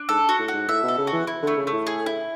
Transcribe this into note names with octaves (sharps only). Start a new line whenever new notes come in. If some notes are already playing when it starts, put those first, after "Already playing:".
Already playing: D4
G#2 A4
F#4
A2
F#4
G#2
A2 E5
B2
A4
C#3
F#4
E3
E4
D3 A3
C#3
A3
A2
G#4
E4